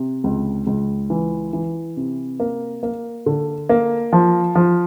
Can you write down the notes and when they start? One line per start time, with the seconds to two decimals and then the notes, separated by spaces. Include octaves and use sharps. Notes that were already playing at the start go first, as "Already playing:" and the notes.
Already playing: C3
0.24 C#2
0.67 C#2
1.10 E3
1.53 E3
1.97 C3
2.40 A#3
2.83 A#3
3.26 D3
3.69 A#3
4.13 F3
4.55 F3